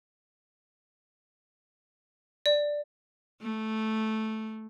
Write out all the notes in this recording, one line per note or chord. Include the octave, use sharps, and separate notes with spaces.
D5
A3